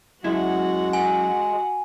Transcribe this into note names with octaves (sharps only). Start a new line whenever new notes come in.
F#2 G#3 E4 F#4 F#5
G#5